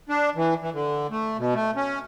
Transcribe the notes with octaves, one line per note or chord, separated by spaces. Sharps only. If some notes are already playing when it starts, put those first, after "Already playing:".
D4
E3
E3
D3
A3
B2
A3
C#4